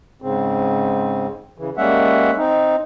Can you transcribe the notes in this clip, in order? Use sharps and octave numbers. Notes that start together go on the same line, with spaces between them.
G#2 C#3 C4
C#3 E3
G3 G#3 A#3 C#4 E5 F#5
C4 D#4